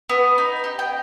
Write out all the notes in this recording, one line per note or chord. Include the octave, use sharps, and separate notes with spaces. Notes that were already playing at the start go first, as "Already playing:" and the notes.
B3
D#4
G4
G5